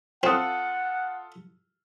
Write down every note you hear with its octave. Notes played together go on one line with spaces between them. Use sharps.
C4 F4 A4 F#5 D#6